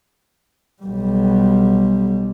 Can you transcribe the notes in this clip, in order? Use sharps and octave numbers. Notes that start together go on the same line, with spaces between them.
B1 G3